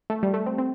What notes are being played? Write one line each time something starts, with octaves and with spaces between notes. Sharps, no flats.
A3
G3
A3
C4
C4